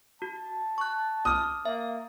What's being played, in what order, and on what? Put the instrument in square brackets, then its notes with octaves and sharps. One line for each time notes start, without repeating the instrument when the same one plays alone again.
[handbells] F#4 [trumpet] A5
[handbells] C#6 F#6
[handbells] D6 F6 [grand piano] D#6
[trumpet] A#3 [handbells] E5